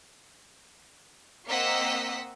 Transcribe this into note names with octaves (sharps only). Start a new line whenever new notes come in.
A#3 C4 D#5 F#5 E6 B6